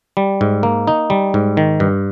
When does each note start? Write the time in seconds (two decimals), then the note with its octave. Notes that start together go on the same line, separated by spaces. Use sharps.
0.17 G3
0.41 G#2
0.63 A#3
0.87 D#4
1.10 G3
1.34 G#2
1.57 D#3
1.80 G2